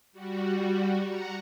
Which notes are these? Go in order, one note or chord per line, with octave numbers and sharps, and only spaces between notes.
G3 F#4
F#5 A#5